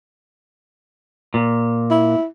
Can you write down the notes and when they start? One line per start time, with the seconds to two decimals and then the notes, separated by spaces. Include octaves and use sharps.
1.34 A#2
1.91 E4